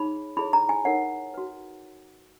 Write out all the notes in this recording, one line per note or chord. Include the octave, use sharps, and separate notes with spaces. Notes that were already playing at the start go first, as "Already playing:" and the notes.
Already playing: D#4 G#4 C#5 B5
E4 G#4 C#5 B5
A#5
G#5
D#4 A#4 C#5 F#5
F#4 B4